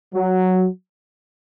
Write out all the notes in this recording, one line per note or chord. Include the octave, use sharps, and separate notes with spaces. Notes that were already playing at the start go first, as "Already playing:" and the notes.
F#3